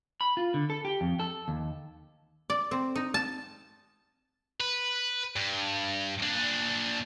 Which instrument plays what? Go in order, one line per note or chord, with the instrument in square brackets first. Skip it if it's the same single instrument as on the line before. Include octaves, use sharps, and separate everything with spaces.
[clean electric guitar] B5
F4
D3
A4
G4
F2
A4
D#2
[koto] D5
C4
D#4
A5
[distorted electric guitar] B4
G2
A#2 D4